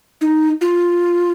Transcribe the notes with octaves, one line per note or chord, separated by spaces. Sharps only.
D#4
F4